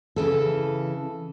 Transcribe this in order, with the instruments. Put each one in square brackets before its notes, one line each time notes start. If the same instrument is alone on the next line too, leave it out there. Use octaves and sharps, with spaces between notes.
[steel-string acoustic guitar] C#3 E3 A4